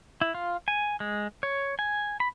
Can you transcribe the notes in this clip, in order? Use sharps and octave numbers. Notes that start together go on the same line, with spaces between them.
E4
F4
G#5
G#3
C#5
G#5
B5